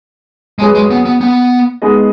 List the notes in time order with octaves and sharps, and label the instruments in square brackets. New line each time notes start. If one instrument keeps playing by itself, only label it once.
[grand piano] F#2 F#3 C#4 G#4 B4 [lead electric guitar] G#3
[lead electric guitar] G#3
B3
B3
B3
[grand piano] G#3 B3 D#4 G#4 D#5